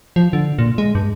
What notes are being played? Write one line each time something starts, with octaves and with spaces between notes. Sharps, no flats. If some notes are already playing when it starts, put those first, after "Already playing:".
F3
D3
A#2
G#3
G2